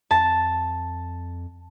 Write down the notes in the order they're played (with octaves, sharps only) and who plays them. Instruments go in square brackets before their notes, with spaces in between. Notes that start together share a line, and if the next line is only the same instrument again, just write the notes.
[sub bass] F2 [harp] A5